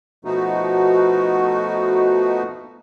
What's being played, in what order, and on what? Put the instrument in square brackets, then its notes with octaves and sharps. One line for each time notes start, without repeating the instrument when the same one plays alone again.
[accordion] B2 F3 A3 B3 D#4 F#4